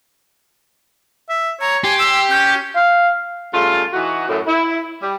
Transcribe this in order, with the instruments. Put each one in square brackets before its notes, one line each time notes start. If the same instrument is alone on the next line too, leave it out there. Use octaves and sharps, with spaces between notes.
[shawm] E5
[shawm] C#5 [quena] A#5
[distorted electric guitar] G4 [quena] G#5 [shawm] C6
[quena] E6
[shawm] C#4 [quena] G6
[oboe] F5
[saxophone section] C#3 G3 A3 F4
E3 D#4 F#4
F#2 A2
E4
G3